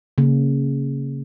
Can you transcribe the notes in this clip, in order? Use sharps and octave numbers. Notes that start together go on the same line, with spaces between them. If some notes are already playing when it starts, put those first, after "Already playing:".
C#3 A#3 C#4